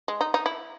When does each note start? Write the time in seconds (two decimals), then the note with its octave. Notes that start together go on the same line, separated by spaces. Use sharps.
0.08 G#3
0.21 D#4
0.34 D#4
0.46 E4